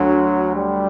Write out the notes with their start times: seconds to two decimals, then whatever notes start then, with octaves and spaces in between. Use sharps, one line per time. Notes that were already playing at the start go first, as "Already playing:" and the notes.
Already playing: D2 F#3
0.56 G3